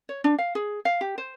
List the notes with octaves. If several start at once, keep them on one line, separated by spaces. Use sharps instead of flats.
C#5
D4
F5
G#4
F5
G4
C5